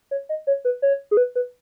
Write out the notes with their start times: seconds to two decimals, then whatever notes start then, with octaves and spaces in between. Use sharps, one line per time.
0.11 C#5
0.29 D#5
0.47 C#5
0.65 B4
0.82 C#5
1.11 G#4
1.17 B4
1.35 B4